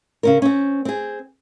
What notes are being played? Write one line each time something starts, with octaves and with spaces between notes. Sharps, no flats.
C#3 C#4 A#4
C4 C#4
C4 G#4